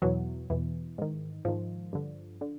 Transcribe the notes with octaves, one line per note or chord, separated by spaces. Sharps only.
E2 B2 E3 F#3
E2 B2 E3
G#2 D#3
G#2 D#3 F3
G2 D3
D3